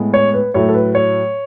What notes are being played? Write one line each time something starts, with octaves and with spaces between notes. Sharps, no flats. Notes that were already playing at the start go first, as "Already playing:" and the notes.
Already playing: A2 G#3 B3
C#5
B4
A2 F#3 A3 C#5
A4
B4
C#5